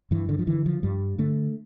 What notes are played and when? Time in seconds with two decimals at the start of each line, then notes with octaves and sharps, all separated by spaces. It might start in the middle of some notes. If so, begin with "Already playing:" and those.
0.11 G2 E3
0.29 D3
0.39 F3
0.47 D3 E3
0.66 F3
0.83 G2 G3
1.18 D3 A3